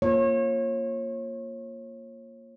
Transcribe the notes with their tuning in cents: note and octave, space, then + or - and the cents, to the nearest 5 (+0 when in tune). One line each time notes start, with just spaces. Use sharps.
A#3 +0 F4 +0 C#5 -30